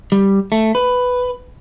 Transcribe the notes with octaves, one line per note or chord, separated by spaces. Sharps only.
G3
A3
B4